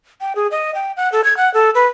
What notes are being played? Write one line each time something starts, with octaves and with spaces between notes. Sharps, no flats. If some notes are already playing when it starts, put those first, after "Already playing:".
G5
G#4
D#5
G5
F#5
A4
G#6
F#5
A4
B4